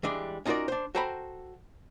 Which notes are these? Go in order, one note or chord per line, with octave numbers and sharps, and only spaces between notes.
E3 G3 G#3 D4
C#4 D#4 F4 F#4 A#4 D5
D4 C5
F#4 A4 C5 G5 A#5 B5